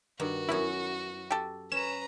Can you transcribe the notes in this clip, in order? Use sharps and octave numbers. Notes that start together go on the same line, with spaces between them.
G2 D#3 F#4
F#2 B3 C#4 E4
G4 A4
C#4 B4 A#5 E7